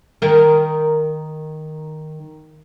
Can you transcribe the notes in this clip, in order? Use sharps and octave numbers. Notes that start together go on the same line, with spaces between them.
D#3 A#4